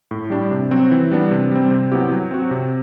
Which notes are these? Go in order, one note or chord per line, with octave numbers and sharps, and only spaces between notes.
A2
G3 D4 G4
C3
F#3 C4 F#4
E3
G3 B3 D4
C3
G3 C4
C3
F#3 B3 E4 G4
F#3
C4 F#4
C3